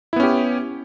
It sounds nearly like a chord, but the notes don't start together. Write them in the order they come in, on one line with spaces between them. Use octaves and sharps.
E4 B3 C#4 G4